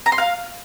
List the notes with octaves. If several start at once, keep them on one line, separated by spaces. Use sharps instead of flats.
A#5
C6
F5